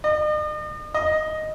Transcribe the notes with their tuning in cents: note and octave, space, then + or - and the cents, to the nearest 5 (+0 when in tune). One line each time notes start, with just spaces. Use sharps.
D#5 -45
D#5 +0